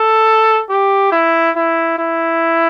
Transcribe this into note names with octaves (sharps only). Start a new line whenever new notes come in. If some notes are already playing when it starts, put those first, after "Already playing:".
Already playing: A4
G4
E4
E4
E4